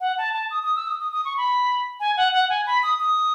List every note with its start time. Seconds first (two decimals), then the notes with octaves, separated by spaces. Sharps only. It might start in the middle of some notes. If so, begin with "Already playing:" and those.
0.01 F#5
0.18 A5
0.34 A5
0.51 D#6
0.63 D#6
0.76 E6
0.87 D#6
1.00 D#6
1.13 D#6
1.25 C#6
1.37 B5
2.00 G#5
2.17 F#5
2.33 F#5
2.50 G#5
2.67 B5
2.83 D#6
3.00 D#6